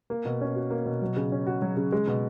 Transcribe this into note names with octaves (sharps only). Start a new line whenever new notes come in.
A#3
B2
C#4
F#4
A#3
B2
F#3
C#3
C#4
F#4
F#3
C#3
G#3
B2